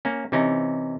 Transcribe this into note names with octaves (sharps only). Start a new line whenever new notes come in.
A#3 C#4
C3 E3 C#4 D#4